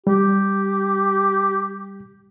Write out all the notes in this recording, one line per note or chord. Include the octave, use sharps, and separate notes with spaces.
G3 G4